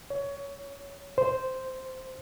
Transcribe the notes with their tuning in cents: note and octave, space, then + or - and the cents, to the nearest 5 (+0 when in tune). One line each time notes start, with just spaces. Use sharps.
C#5 +25
C5 -5